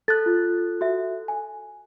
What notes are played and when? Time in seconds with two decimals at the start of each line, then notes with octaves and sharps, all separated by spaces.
0.08 A4 F#6 A6
0.26 F4
0.81 F#4 E5
1.28 G#5